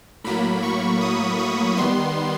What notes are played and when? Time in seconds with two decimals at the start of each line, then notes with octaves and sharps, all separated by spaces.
0.24 A2 F#3 A#3 B5
0.63 C#6
1.01 D#6
1.39 C#6
1.77 D#3 G3 B3 C6